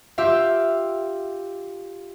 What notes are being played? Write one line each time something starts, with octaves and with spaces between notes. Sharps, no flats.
F4 G4 E5 F5